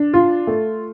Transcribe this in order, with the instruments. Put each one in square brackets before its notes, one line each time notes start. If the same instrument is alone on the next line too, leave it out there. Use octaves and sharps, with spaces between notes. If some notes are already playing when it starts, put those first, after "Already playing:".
Already playing: [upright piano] D4
F4
A3